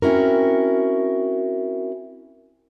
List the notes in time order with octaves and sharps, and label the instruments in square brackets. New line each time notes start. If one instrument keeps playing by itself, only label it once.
[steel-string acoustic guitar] C4 C#4 E4 F#4 A#4